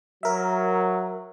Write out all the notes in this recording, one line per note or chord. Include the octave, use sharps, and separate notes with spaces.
F#3 A#4 E5